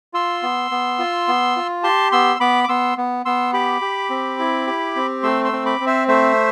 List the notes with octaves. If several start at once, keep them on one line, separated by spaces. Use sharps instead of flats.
F4 C6 E6
B3
B3
F4
B3
F4
G4 A5 C6
B3 C6 E6
B3 B5 D6
D6
B3 C6 E6
B3
B3 C6 E6
G4 B5 D6
G4
C4
E4
G4
C4
A3 C6 E6
C6 E6
C4
B5 D6
C4
C5 E5
A3 C5 E5